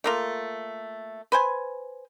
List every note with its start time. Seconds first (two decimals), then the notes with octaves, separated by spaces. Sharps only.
0.04 A3 A#3 F4
1.32 B4 C5 G#5